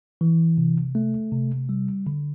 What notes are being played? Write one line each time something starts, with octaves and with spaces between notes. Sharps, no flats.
E3
C3
A3
C3
G3
D3